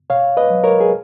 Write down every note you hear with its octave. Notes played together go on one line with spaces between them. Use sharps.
B2 C#5 F5
B4 D#5
F#3
A#4 C#5
G#4